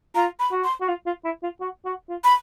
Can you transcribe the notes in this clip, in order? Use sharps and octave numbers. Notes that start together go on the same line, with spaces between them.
F4 A#5
B5
F#4
C6
F#4
F4
F4
E4
F4
F#4
F#4
F4
B5